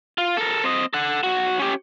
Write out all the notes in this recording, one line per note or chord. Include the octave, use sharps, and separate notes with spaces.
F4
A4 A#4
C4 D#5
A4 F#5
B1 F#4
C#4 G4